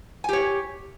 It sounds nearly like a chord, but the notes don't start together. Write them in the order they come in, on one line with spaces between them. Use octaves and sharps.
G#5 G4 C#5